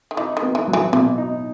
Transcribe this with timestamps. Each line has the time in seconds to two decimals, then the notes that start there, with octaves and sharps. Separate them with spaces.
0.11 D#3
0.17 E3 D#4
0.37 D#3
0.42 B3
0.55 E3
0.68 F#3
0.73 E3
0.93 B2 E3
1.18 D#4